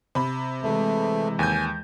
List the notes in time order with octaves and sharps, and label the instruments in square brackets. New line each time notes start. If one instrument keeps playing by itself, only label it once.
[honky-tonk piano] C3 B5
[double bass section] E3 G#3 [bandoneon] A3
[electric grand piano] D#2 G6 [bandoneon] G#5